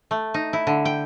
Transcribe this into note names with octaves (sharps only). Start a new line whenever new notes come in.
A3
D#4
E4
D3
G5